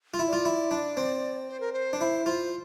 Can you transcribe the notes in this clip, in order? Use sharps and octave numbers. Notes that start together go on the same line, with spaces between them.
F4
E4
D5
F4
E4
D4
C4
C5
A#4
C5
D4
E4 C5
F4 C5